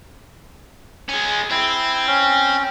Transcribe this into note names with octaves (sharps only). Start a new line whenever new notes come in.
G#3 C#4
C4 E4
C#4